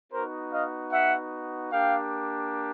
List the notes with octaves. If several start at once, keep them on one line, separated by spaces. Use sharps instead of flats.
B3 D#4 F#4 A#4 C5
D#5 F5
E5 F#5
A#3 D4 G4 F5 G5